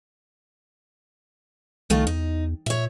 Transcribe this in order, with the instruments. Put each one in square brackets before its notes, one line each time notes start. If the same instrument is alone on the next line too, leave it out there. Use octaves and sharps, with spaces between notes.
[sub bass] C2 [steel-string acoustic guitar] D#3 A3 F4
[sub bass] E2 [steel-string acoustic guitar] D#4
[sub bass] A#2 [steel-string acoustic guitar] C#5 E5